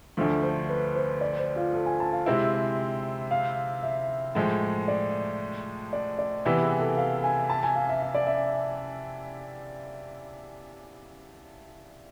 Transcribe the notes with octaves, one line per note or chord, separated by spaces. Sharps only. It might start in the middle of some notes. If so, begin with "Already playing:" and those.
D2 D3 F3 A3
C5
B4
C5
D5
C5
F4
A4
G#5
A5
F5
C3 G#3 C4 E4
F5
E5
A2 F3 G#3
D5
D5
D5
C3 E3 B3 E4 B4
G#4
A4
F5
G#5
A5
G#5
F5
E5
E5
D5
E5